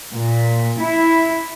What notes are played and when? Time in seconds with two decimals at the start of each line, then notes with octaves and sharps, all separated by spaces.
0.14 A#2
0.79 E4